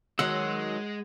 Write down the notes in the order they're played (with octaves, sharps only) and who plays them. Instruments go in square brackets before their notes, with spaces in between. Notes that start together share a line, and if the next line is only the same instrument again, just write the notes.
[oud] D#3 F#3 [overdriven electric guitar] G#3 [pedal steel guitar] D#5 C6 E6 [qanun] F#5